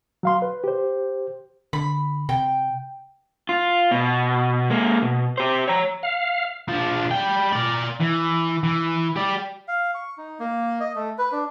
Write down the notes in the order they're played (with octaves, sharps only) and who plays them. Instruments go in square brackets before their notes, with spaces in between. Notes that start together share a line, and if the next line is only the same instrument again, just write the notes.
[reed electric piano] F#3 F5 C6
B4
G4 C5
[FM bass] D3 [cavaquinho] B5
[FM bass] C3 [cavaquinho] G5
[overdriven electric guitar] F4
B2
G#3 A#3
B2
G4 C5
C#5 A#5
[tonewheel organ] F5
[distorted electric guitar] F3 D4
G3 G5
A#4 D5
E3
E3
G4 D5
[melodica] F5
C#6
D#4
A#3
D#5
A3
B4
D4